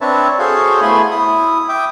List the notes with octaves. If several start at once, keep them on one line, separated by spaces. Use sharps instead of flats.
C4 D4 B4 C#5 E5 A5
F#4 G#4 A4 C5 C#5 F5
A3 B3 E4 G#5 B5 C6
E4 D#6
E5 G5 D6 D#6